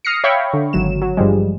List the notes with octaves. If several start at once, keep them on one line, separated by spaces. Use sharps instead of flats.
D#6 F6 A#6 C7 C#7
C#5 E5 F5 G5 B5 C#6
D3
G#1 F#3 E7
F#3
G2 F3 G3 G#3